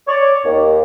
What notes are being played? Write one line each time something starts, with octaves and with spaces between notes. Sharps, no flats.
C#5 D5
D#2